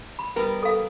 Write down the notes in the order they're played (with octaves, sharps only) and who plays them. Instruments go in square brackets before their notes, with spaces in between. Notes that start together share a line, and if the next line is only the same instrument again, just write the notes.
[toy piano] B5
[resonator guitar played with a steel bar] G3 B3 A#4
[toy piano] A4 F5